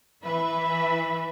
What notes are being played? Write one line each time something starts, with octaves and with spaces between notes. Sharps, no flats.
E3 B4 E5